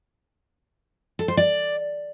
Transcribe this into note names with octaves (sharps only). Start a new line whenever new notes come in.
A4
C5
D5